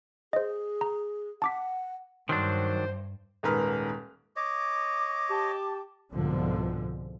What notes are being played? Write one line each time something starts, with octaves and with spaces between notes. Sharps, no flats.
G#4 C5 D#5
A#5
F#5 A5 D6 B6
G2 D#3 F#3 D4 C5
D#1 G#2 A#4 B4 F6
C#5 D#5 D6
G4 A5
C2 G#2 B2 D3 F3